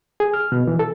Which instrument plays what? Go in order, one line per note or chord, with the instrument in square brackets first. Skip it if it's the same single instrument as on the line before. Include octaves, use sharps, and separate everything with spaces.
[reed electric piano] G#4
F6
B2
E3
A4